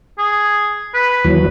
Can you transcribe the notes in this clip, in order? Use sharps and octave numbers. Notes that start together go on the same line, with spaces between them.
G#4
B4
D#2 E3 F#3